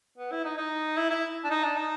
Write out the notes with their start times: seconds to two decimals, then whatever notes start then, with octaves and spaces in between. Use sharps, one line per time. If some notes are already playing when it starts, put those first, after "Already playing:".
0.18 B3
0.31 E4
0.44 D#4
0.57 D#4
0.97 E4
1.10 E4
1.44 D4
1.50 D#4
1.63 D4
1.76 D#4